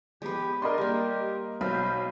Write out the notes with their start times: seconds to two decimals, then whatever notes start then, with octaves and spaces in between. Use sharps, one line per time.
0.22 F3 G#3 B3 G4 B4
0.62 D4 G#4 A#4 D5 D#5 C6
0.78 G3 A#3 G4
1.61 B1 B4 C5 F5